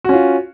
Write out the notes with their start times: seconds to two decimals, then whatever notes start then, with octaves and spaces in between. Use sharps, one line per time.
0.04 F#4
0.09 C#4
0.13 F4